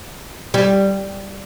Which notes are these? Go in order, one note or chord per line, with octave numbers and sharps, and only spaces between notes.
G3